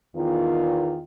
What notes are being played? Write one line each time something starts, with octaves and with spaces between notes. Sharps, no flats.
E2 D#3 F4